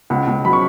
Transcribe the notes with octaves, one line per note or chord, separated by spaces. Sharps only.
C#2 F#5
C#2
F#3 B5
C#6